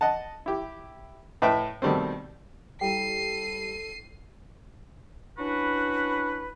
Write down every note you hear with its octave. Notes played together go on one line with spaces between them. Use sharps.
D#5 F#5 A5
E4 G4
A2 B4 D#5 E5 G5
B2 D#3 G3 A3 C4
G3 E4 A4 G5 C7 D#7
C#4 D4 E4 F#4 B4